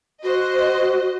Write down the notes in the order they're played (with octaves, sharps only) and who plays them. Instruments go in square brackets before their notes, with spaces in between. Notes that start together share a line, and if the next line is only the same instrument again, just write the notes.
[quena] F#4 [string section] C5 D#5